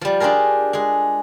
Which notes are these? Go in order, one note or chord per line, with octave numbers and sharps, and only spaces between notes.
F3 G3
D4 F4 G4 G#4 A#4
G#3 G#4